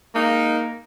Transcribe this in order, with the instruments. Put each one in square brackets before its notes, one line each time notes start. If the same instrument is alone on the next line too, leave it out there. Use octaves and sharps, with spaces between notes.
[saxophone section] G#3 D#4 [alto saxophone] A#3